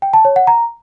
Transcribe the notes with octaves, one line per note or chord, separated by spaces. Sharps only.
G5
A5
C#5
F#5
A#5